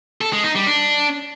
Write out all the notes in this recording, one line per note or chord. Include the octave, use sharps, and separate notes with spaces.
A4
G#3
D#4
G3
D4